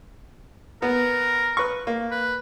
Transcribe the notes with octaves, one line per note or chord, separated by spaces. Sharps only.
B3 A#4
B4 C#6
A#3
B4